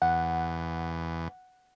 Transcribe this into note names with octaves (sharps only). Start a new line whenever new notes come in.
E2 F#5